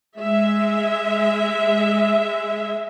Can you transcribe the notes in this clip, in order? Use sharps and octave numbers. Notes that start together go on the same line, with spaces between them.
G#3 E5